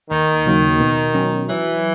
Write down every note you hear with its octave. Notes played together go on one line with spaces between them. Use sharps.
D#2 D#3
C#3 F#3 A#3 D#4
B2
F#3 C#4
E3 F#3